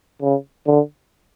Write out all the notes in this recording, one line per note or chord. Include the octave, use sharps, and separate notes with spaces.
C#3
D3